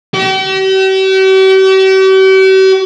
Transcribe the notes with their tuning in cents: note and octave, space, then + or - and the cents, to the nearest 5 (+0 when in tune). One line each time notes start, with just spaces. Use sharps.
G4 -45